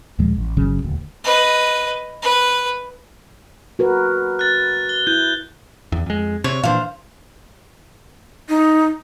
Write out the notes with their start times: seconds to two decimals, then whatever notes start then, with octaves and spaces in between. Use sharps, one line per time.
0.19 D#2 A#2 F3 G#3
0.37 A1
0.57 G1 C#3 F#3 C#4
0.83 D#1 D2
1.24 B4 D#5
2.23 B4
3.79 F#4 A#4 B4
4.39 F#6 A6
4.89 G7
5.07 E4 G6
5.92 E2
6.06 F2 G#3
6.44 C3 C#5
6.63 A#2 E3 D4 C5 F5
8.49 D#4